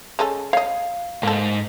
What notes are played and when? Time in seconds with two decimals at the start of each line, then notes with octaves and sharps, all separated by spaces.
0.19 G#3 C#4 A4
0.53 C#5 D#5 F5
1.23 G#2 A#3 A4